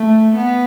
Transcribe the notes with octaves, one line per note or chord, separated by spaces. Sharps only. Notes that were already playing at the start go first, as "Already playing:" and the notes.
Already playing: A3
B3